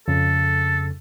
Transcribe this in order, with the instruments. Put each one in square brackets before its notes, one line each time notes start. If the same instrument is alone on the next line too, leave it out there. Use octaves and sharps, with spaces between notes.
[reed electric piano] F2 C#3 [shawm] A4